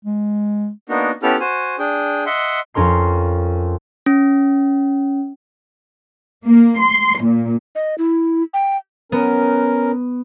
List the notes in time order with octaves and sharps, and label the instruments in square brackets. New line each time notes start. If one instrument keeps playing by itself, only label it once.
[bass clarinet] G#3
[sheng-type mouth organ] A#3 B3 D4 D#4 F#4 A#4
B3 C#4 E4 G4 A4 F6
F#4 C5 G#5
D4 G#4 G5
D#5 E5 F#5 C6
[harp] F2 C#4 A#4 C6 C7
[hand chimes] C#4
[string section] A#3
C6
A#2
[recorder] D#5
E4
G5
[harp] B3 [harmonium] C#4 A#4